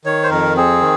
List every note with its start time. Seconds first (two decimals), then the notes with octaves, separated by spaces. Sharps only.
0.05 D#3 C#5
0.23 C5
0.30 F2 A#4
0.56 C4 G#4
0.82 D#3